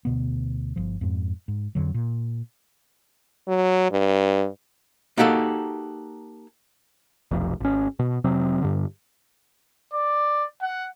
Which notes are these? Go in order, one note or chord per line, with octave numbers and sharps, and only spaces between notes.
D2 B2 B3
G1 F3
F2 G#2
G#2
F2 D3 F#3
A#2
F#3
G2
A#3 D#4 F#4 G4 A4
F1 B1 F2
G#1 C#4
B2
F1 C3 F#3 C4
G2 D3
D5
F#5